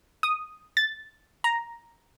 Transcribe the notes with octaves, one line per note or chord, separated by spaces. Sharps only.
D#6
A6
A#5